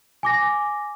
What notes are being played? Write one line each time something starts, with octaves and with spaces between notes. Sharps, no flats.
G#5 D6 A#6